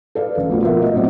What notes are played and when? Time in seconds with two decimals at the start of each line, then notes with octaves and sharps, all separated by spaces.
0.15 A4 B4 D5 F5
0.37 A1
0.49 B2 F3 A3 B3
0.62 B3 F4 F#4 A#4 E5
0.82 D#5
0.94 A2 F#3 B3 C4 D5